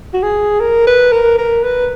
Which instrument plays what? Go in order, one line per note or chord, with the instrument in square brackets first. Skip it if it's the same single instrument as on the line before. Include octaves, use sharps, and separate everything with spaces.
[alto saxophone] F#4
G#4
A#4
B4
A#4
A#4
B4